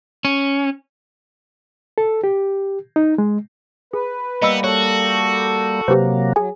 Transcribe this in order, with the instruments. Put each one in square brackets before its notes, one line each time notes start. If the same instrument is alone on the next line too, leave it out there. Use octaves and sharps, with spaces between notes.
[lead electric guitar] C#4
[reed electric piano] A4
G4
D#4
G#3
[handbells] G#4 [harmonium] B4
[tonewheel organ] G3 A#3 [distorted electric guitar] B3 [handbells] D#5 B5 E6
[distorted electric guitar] F#4 [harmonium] A4 [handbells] C#5
[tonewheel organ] C3 F#3 A#3 [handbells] G4 B4 C5
[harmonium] F#3 [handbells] G#4 G#5